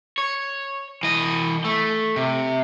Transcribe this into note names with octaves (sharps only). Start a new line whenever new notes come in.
C#5
E3 D#5
A3
C3